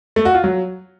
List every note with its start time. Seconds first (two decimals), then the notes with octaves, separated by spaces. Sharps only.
0.16 A3
0.25 F#4
0.35 F4
0.44 F#3